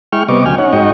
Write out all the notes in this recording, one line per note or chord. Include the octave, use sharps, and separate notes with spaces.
G#3 E4 G5 C#6 F6
C3 G3 B3 D#5 C#6 D6
D2 F#3 G5 G#5 F6
C#4 D#4 C#5 F#5
G#2 D#4 F#4 D#5 G5 C#6